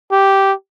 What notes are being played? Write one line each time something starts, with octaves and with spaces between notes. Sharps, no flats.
G4